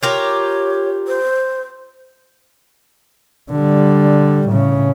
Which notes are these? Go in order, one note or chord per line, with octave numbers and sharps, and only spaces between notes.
F4 G4 A#4 C#5
C5
D3 G3
A2 C#3